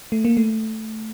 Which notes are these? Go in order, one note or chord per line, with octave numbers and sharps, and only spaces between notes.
A3
A#3
A3